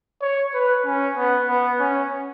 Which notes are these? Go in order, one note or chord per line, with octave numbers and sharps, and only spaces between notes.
C#5
B4
C#4
B3
B3
C#4